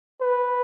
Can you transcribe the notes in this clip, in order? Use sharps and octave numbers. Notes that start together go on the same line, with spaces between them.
B4